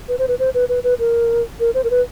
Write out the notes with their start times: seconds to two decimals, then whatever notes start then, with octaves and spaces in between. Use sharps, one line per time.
0.09 B4
0.19 C5
0.28 B4
0.39 C5
0.54 B4
0.69 B4
0.84 B4
0.99 A#4
1.60 A#4
1.74 C5
1.84 A#4
1.91 B4